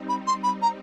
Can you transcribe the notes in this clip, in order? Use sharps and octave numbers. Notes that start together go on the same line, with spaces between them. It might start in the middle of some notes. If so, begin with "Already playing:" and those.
Already playing: G3 C4 D#4
B5
C6
B5
A#5